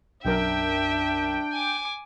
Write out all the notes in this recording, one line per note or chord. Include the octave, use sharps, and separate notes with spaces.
B1 F#2 D4 A#4 E5 G5
G#5 D6 D#7